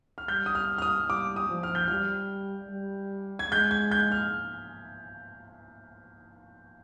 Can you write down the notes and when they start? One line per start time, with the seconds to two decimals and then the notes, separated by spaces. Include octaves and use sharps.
0.18 F6
0.28 G3 G6
0.46 D#6
0.55 F6
0.78 F6
0.82 D#6
1.09 G3 D6
1.36 D#6
1.50 F3
1.63 F6
1.75 G6
1.88 G3 F6
2.70 G3
3.39 G#6
3.51 G#3 G6
3.71 G#6
3.91 G6
4.12 F6